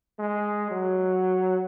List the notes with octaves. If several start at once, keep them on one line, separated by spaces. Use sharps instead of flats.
G#3
F#3